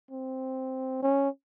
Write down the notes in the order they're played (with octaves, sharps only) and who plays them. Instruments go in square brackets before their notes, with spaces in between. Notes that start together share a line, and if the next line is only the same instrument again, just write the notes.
[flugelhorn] C4
C#4